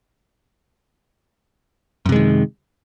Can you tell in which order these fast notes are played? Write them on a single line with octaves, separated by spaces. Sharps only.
F#2 C3 G#3 D#3